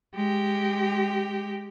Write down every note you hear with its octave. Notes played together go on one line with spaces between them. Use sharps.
G#3 G4